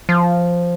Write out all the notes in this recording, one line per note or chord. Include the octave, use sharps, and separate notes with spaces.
F3